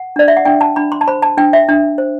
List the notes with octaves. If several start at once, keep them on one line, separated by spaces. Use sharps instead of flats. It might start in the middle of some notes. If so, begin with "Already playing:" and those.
Already playing: F#5
D4 D5
E5
F#5
D4 G5
A5
D4 B5
C6
A5
C5 B5
A5
D4 G5
E5
D4
C5